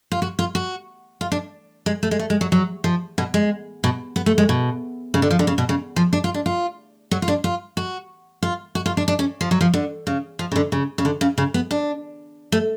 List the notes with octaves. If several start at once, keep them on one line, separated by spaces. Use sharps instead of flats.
F4
F#4
F4
F#4
F4
D4
G#3
A3
G#3
A3
G#3
F#3
F#3
F3
B2
G#3
B2
B3
A3
G#3
B2
C#3
D3
F3
D3
C#3
B2
C#3
F3
D4
F4
D4
F4
F#3
F4
D4
F4
F#4
F4
F#4
F4
D4
D4
C#4
F3
F#3
F3
D3
C#3
F3
C#3
D3
C#3
C#3
D3
C#3
C#3
B3
D4
A3